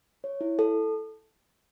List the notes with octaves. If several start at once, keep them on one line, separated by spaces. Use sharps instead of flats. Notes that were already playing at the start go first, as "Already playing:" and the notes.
C#5
E4
A4